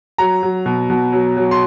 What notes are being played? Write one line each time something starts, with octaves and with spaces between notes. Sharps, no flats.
F#3 A#5
F#3
B2
B2
F#3
F#3
C6